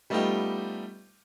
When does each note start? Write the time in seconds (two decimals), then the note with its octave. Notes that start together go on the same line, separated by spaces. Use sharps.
0.10 G3 A3 B3 D#4 F4 G4